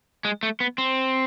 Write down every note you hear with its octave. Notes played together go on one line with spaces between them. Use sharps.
G#3
A3
B3
C4